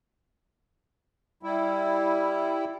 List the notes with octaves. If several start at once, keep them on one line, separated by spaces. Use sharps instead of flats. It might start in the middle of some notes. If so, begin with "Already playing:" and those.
G3 E4